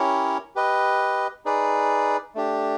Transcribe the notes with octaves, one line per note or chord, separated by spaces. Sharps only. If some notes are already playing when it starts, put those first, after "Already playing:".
Already playing: C#4 E4 G4 A#4 C#5
G4 B4 D#5
D#4 G#4 B4 D5
A3 D4 G4